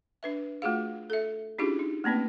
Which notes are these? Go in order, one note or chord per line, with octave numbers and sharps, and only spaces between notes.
D4 B4 E5
A3 F4 F#4 G#4 F5
A4 E5
C#4 D4 E4 F4 G4 G#4
D#4
A3 A#3 C4 C#4 B4